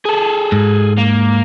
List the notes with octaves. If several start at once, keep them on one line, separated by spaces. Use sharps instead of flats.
G#4 A4
G#2
A#3